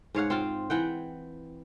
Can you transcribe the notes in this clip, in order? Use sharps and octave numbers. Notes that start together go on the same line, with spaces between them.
G#2 C#5 F5 F#5
C4 F4
E3 F#5 G5